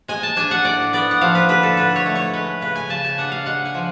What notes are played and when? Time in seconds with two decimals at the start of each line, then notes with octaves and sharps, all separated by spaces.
0.08 G#3 G#5
0.23 A5
0.37 D4 G#5
0.51 F#5
0.64 A2 D5
0.93 B3 D5
1.11 F#5
1.21 F3 F5
1.35 B4
1.49 D3 B4
1.63 A4
1.77 D3 B4
1.96 C#5
2.05 A3
2.15 C#5
2.33 G#3 B4
2.61 C#3 B4
2.75 G#5
2.90 C#3 A5
3.05 G#5
3.18 D4 F#5
3.32 F5
3.46 G#3 F#5
3.65 G#5
3.74 F3